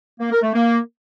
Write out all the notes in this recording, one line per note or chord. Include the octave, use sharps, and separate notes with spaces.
A#3
A#4
A3
A#3